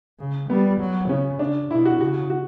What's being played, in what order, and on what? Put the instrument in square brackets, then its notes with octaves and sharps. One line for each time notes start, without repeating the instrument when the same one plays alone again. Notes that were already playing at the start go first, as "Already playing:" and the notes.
[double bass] C#3
[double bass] G3 [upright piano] B3
[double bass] F#3
[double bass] C#3 [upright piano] C#4
[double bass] C#3 [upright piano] D4
[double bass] B2 [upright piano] E4
[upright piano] F#4
[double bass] C#3 [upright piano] F#4
[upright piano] F#4